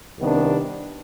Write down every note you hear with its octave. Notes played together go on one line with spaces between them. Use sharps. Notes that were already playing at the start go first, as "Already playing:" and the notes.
C2 C3 D#3 B3 D4